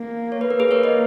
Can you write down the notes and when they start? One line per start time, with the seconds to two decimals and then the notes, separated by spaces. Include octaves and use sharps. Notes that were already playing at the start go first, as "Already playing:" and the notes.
Already playing: A#3
0.32 C#5
0.41 B4
0.50 A#4
0.60 G#4 B4
0.71 A#3 A#4 C#5
0.84 B4 D#5